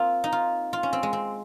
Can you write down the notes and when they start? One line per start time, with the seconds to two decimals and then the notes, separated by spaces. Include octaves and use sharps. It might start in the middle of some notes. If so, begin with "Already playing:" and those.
Already playing: A#3 C4 F4
0.24 D#4
0.32 F4
0.73 F4
0.83 C#4
0.93 C4
1.03 G#3
1.13 C4